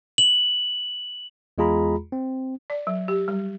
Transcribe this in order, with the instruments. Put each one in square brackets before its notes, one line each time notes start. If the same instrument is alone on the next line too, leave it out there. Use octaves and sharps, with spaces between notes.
[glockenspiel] F#7
[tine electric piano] E2 G#3 F4 G#4 A#5 B5
C4
[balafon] D5
F#3
G4
G3